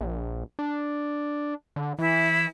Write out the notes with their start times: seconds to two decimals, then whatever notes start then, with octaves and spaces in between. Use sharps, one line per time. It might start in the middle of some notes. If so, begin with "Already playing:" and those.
0.01 A#1
0.59 D4
1.76 D3
1.99 E3 E4